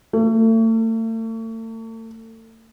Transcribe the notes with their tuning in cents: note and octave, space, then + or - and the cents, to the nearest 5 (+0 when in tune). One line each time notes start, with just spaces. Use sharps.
A3 +40